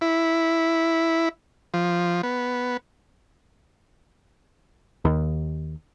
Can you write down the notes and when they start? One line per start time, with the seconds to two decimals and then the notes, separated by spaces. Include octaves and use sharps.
0.01 E4
1.74 F3
2.23 B3
5.05 D#2